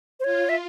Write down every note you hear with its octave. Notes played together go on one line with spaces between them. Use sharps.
C5
F4 C#5
E5